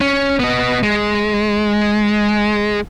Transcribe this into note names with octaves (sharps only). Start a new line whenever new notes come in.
C#4
B3 D#5
G#3